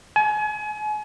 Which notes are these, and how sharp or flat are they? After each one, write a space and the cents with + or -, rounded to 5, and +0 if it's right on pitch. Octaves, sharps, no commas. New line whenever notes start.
G#5 +35